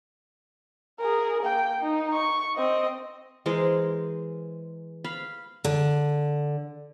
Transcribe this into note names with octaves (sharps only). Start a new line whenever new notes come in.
G#4 A#4
A#3 G5
D#4
C#6
C4 D#5
E3 G#3 A#4 C5
F5 B5
D3